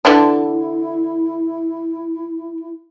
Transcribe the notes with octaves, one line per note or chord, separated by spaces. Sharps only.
D3 E3 D4 E4